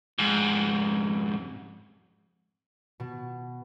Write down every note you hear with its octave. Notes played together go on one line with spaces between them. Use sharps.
F2 G#2
B2